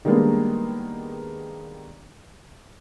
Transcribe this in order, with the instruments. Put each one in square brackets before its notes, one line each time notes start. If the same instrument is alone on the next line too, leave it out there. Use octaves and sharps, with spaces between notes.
[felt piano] D#3 G3 G#3 A#3 B3 D4